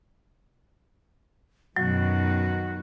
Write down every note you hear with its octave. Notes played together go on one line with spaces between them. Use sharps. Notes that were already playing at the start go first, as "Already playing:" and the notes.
F#2 B2 D#3 F#3 F#4